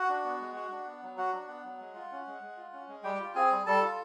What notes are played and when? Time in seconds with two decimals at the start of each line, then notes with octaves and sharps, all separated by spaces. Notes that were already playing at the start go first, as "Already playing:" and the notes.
Already playing: F#4 F#5
0.09 D4
0.25 B3
0.41 G#3
0.56 F#4
0.72 D4
0.87 B3
1.03 F#3
1.18 F#4 F#5
1.33 D4
1.48 B3
1.65 F#3
1.80 G#3
1.95 F4
2.12 C#4
2.27 G#3
2.42 G#3
2.57 F4
2.73 C#4
2.88 G#3
3.04 G3 G4 G5
3.20 F4
3.35 C4 G#4 G#5
3.51 G3
3.66 G3 A4 A5
3.81 F4